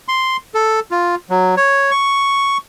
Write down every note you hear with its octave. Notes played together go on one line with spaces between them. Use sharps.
C6
A4
F4
F#3
C#5
C#6